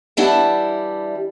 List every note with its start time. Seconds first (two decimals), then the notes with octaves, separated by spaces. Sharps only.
0.17 E3 G3 D4 E4 F#5 A5